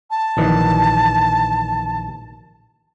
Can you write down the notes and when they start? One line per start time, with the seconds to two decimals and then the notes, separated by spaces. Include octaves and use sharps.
0.10 A5
0.37 A#1 D#3 E3